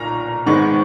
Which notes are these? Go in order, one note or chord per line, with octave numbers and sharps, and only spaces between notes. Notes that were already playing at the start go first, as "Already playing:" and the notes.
Already playing: B1 A#2 A#5 C#6
G#1 G#2 D#3 G#3 B3 C#6